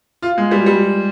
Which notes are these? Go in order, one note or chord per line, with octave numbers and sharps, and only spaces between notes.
F4
G#3
G3
G3